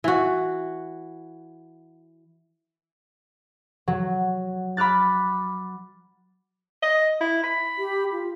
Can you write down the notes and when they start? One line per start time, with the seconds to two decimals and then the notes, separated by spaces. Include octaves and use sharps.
0.04 E3 F#4
3.88 F#3
4.77 B5 D6 F6 F#6 A6
6.83 D#5
7.21 E4
7.44 B5
7.78 G4
8.12 F4